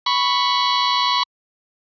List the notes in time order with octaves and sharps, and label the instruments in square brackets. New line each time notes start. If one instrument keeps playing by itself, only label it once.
[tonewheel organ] B5 C#6